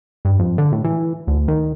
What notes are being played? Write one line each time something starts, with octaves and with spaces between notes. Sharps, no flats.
G2
F2
D3
A2
E3
D2
D#3